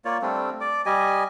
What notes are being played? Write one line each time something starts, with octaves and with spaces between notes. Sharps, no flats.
A#3 F4 C#5 D5
G3 A3 C4 D4
D5 D6
G3 G4 D#5 G#5